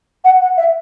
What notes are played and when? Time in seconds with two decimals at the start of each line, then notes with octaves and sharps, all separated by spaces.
0.25 F#5
0.41 F#5
0.57 E5